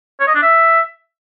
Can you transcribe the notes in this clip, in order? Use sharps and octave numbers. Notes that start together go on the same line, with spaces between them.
C#5
D#5
D4
E5